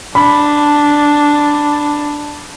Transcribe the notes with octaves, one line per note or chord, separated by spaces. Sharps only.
D4 B5